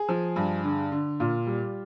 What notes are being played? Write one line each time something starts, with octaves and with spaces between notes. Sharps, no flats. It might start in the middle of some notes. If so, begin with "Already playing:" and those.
Already playing: G#4
F3
G2
D3
D3
A#2 F4
G3